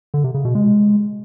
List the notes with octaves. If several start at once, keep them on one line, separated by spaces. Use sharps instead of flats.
D3
C3
C#3
B2
G#3